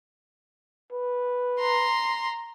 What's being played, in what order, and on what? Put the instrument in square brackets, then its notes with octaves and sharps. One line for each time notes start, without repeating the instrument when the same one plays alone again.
[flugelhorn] B4
[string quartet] A#5 C6